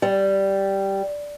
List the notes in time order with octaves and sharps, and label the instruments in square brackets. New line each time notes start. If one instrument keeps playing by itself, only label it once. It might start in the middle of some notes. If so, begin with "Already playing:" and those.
[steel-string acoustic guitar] G3